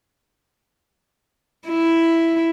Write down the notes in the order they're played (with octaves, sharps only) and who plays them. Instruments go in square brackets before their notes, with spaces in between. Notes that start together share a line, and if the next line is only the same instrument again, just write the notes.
[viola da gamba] E4